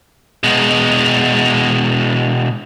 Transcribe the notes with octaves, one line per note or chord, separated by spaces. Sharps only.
B2 G#3